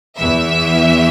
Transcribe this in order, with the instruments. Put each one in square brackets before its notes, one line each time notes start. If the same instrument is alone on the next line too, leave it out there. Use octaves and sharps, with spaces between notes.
[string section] E2 E3 E5